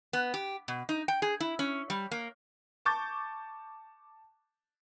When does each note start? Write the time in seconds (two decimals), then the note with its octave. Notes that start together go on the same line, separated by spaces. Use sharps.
0.13 B3
0.34 G4
0.68 B2
0.89 D#4
1.08 G5
1.22 G#4
1.40 E4
1.59 C#4
1.90 G3
2.11 A#3
2.85 A5 C#6 D6 G6 A6